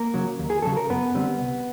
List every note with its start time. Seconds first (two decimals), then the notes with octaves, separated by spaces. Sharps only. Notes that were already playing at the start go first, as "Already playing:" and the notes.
Already playing: A#3 A#4
0.14 C#3 F#3
0.39 D#2
0.50 G#4
0.62 C#3 F#3 A4
0.76 A#4
0.89 F#2 B3 B4
1.14 D3 G3 C4
1.39 C2